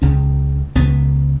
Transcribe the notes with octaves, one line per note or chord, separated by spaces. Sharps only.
C#2 C#3 C#4
C#2 C#3 B3